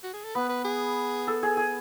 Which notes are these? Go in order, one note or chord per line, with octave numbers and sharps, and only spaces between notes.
F#4
G#4
A4
B3 B4
B4
G#4
A4
G#4
G#4